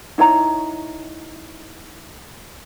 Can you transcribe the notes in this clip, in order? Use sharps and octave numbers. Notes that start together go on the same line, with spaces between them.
D#4 E4 C#5 A#5